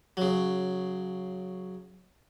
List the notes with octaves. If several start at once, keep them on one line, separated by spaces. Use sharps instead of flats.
C#3 F#3